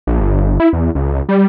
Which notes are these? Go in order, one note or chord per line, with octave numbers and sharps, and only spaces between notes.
A#1
G1
E4
E2
C#2
G3